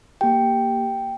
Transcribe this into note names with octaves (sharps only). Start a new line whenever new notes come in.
A#3 G4 G5